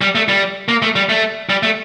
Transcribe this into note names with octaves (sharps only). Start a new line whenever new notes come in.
G3
A3
G3
A#3
A3
G3
A3
G3
A3